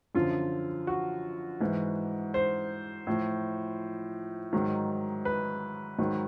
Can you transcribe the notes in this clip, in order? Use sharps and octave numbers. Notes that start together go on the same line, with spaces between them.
F#2 D3 F3 F4
F#4
G#2 E3
C5
A2 F3
G#2 D#3 F#3
B4
G#2 D#3 F#3